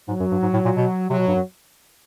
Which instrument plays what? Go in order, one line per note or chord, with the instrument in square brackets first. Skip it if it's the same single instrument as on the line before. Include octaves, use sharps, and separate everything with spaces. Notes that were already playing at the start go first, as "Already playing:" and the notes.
[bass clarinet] G#2 [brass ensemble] F#3
[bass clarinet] F#2
G2
G#2
A2
A#2
B2
[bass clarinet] C3 [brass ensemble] F#3
[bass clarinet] B2
G2
F#2